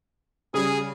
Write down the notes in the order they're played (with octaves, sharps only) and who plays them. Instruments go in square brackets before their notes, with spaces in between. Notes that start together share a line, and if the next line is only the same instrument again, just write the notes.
[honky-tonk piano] C#3 G3 [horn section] G#4